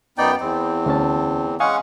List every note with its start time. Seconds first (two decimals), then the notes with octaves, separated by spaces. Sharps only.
0.18 F#2 B3 D#4 D5 G5
0.40 E2 C4
0.86 D2 C#4 A5
1.60 G#3 C#4 F5 F#5 G#5 C#6 D#6